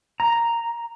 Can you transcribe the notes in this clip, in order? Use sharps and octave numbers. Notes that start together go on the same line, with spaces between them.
A#5